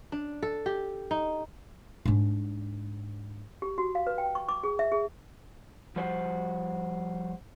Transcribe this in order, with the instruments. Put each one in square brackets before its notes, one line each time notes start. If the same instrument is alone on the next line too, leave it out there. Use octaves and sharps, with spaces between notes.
[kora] D4
A4
G4
D#4
[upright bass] G#2 D4
[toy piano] G4
F#4
F5
B4
G5
C#6
D6
G#4
E5
G#4
[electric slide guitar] F3 G3 F#4 C5